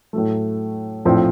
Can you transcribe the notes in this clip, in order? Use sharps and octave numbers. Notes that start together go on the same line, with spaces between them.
A2 F#3 A3
A#1 A2 F3 A3 C4